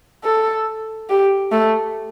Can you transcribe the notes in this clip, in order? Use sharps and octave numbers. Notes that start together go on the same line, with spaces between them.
A4
G4
A3